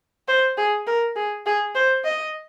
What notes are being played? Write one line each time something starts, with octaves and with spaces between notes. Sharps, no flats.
C5
G#4
A#4
G#4
G#4
C5
D#5